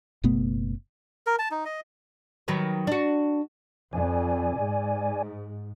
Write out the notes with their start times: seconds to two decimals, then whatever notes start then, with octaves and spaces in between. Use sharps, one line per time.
0.24 F#1 B2 A3 B3
1.27 A#4
1.39 A5
1.51 D#4
1.65 D#5
2.48 D#3 F#3 B4
2.87 D4 F#4
3.93 F2 D5 G#5
4.57 G#2